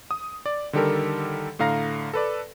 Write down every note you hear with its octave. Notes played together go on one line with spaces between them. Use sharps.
D#6
D5
D3 D#3 G3 G4 A4 A#4
A2 D3 F5 A#5 A#6
A4 B4 D5